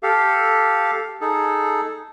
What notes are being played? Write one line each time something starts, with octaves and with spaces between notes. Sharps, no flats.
G4 A4 F5
D#4 G#4 A4